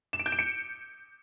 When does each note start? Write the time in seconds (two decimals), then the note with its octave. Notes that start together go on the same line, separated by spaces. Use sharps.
0.13 E7
0.20 D7
0.26 G6
0.32 D7
0.39 C#7